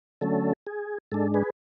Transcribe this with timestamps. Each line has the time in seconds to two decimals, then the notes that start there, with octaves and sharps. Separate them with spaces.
0.21 D3 F#3 A3 C#4 A4
0.67 G#4
1.12 G#2 G#3 D4 A4
1.34 G#4 B4